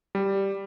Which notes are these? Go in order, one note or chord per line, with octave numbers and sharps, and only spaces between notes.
G3